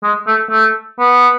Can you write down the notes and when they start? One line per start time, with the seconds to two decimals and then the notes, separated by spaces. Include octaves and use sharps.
0.03 G#3
0.27 A3
0.51 A3
0.99 B3